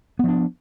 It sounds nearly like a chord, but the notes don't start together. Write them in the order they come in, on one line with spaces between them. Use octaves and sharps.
B3 F3 D4